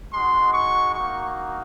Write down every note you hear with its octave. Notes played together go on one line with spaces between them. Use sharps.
G#3 D#4 F#4 C6
C#6
A#3 D#4 F#4 C#6